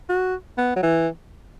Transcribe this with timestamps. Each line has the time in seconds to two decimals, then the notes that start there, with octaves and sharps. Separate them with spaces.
0.09 F#4
0.58 B3
0.76 F#3
0.83 E3